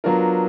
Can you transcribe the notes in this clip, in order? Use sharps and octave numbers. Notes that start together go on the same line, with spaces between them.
F#3 B3 D4 F4 A#4